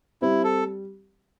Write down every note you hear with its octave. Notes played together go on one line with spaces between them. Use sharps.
G3 C4 E4
A4